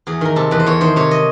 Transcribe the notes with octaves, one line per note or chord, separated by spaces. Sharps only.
E2 G#4
D#3 A#4
C3 A4
E2 B4
C5
E2 C#5
D#3 C5
C3 C#5
D#5